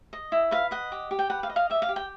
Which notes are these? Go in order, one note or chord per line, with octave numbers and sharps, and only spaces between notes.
D#5
E4
B4 F5
D#5 F#5
G4
G4
G5
B4 F#5
F5
D#5
F5
G4 E5
F5
G4
G5